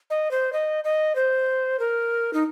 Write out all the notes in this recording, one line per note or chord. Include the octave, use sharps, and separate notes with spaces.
D#5
C5
D#5
D#5
C5
A#4
D#4